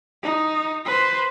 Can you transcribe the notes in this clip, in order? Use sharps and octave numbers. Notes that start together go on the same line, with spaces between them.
D#4
B4 C5